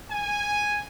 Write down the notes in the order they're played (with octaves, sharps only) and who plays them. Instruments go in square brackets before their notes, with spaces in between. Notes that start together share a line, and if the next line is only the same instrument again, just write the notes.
[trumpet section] G#5